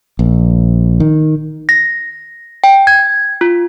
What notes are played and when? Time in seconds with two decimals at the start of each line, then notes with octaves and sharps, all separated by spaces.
0.19 A#1
1.00 D#3
1.69 A#6
2.64 G5
2.87 G#6
3.41 F4